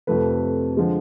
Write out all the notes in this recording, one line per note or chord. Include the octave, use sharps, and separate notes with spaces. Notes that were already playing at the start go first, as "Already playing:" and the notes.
F2 C3 F3 A3 B4
D3 F3 G#3